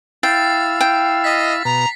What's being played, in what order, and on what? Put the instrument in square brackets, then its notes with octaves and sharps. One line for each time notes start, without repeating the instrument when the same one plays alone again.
[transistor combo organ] E4 F5 E6 [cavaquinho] G5 [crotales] A6 C7
[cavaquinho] G5
[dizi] D#5 [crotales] A6 B6
[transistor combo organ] B2 [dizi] A#5